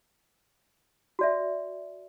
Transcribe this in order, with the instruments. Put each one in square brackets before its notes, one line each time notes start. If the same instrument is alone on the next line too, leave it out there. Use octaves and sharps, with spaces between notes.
[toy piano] F#4 D5 E5